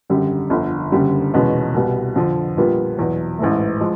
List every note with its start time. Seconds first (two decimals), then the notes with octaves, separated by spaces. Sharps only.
0.10 G#1 F#2 D3 G3
0.50 G1 F2 D3
0.92 F#1 F#2 D3 G3
1.34 F1 E2 B2 G#3 C#4
1.74 C2 B2 G3
2.15 F2 D3 F3
2.57 A#1 A#2 G3 B3
2.99 E2 B2 F#3
3.39 A1 G#2 E3 A3
3.81 F3 G#3